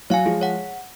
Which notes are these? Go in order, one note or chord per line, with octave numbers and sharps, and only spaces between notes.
F#3 C#5 F5 G#5
F3 G#3 G#4
C#5 F#5